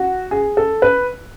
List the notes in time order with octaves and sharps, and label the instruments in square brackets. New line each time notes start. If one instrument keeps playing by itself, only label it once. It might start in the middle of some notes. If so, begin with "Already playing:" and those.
Already playing: [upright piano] F#4
G#4
A4
B4